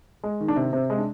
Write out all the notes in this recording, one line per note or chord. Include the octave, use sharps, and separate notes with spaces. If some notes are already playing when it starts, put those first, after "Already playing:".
G#3
D#3
D4
C3
C3 C4
G#3
D4